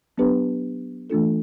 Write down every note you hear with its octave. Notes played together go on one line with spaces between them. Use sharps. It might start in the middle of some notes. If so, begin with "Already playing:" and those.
F#3 B3 D4 G4 B4
E3 A3 D4 F4 A4